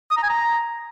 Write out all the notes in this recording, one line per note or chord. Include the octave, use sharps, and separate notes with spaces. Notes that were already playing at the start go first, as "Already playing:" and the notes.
D#6
A#5
G#5
A#5